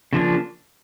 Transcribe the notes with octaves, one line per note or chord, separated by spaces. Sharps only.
C#3 F3 A#3 D4